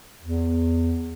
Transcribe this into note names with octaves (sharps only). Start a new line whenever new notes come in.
E2